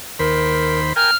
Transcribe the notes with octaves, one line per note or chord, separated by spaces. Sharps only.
D#2 A#4 C5 B5
A#4 G5 G#5 F6